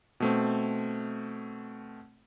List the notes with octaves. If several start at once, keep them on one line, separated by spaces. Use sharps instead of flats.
B2 A3 C4